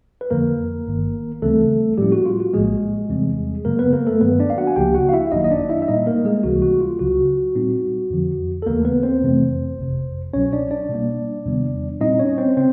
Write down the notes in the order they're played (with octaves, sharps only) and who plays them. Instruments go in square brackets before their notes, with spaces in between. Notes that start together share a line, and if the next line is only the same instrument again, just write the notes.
[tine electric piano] B4
F2 D3 F3 A#3 A#4
G1 G2 D#3
D2 C#3 E3 G3 A3 C4 A4
A2 F3 G3 A#3 C#4 E4 G4
F#4
F4
F#4
A#1 A2 F3 G#3 A#3 G#4
E2 C3 E3 G3 C4
F#2 C#3 F#3 A#3 A#4
B3 B4
A#3 A#4
A3 A4
G2 D#3 F#3 B3 B4
D4 D5
F5
F#4 F#5
G#5
C#2 C#3 F3 A#3 D4 G4 G5
F#4 F#5
F5
E4 E5
G#1 F#2 D#3 F#3 A#3 D#4 D#5
D#5
D4 D5
E4 E5
E5
A#2 G3 A#3 D#4 D#5
A#3 A#4
G#3 G#4
C#2 C3 E3 G3 A#3 F#4
F#4
F4
C#2 C#3 F#3 F#4
A#2 G3 C4 D#4
F2 D3 F3
A4
D#2 C#3 E3 A3 A#3 A#4
B3 B4
C4 C5
F2 C3 E3 A3 C4
G1 F2 C3
C2 B2 F#3 C#4 C#5
D4 D5
D4 D5
B2 G3 A#3
E2 C3 D#3 G3 B3
A#2 G3 C4 D#4 E4 D#5
C#4 C#5
C4 C5
C#3 C4 C5